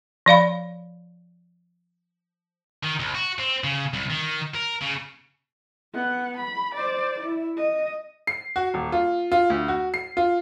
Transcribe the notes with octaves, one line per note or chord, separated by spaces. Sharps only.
F3 D5 F5 B5
D#3
C2
F#4
C4
C#3
C2
D#3
A#4
C#3
B3 F#5
B5
C5 D5
E4
D#5
C7
F#4
D#1
F4
F4
D2
F#4
C7
F4